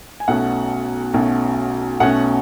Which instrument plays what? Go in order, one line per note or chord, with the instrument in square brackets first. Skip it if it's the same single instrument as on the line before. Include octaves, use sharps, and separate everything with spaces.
[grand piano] G#5
B1 B2 A3 C#4 F#5
B1 B2 A3 C#4
B1 B2 A3 C#4 F#5